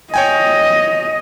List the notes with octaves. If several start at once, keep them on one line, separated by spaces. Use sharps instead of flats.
C#5 D#5 G5 G#5